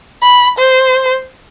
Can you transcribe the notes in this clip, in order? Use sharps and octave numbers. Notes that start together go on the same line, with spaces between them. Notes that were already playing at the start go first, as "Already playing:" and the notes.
B5
C5